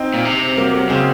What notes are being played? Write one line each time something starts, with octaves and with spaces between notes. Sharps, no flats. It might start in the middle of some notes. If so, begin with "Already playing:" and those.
Already playing: C4 D#4
A#2
C3
F#3 A#3
F#3 A#3
C#3 G#3 C4